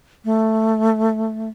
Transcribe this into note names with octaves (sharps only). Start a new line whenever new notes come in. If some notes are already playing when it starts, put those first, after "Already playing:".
A3